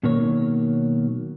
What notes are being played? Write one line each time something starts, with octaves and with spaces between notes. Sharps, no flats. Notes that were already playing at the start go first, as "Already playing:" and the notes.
B2 D#3 F#3 A#3 C#5